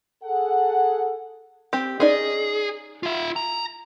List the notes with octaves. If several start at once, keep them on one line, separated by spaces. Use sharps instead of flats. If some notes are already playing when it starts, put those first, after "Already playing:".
G#4 A4 F#5
C4 G4
C#4 D#4 G#4 D5
F4 E5
A#5